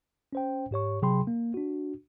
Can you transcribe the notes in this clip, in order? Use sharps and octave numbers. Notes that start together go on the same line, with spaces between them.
C#4 C5 G5
G#2 G4 C#5 C#6
C3 F#3 G#4 G5 B5 C6
A#3
D4 F#4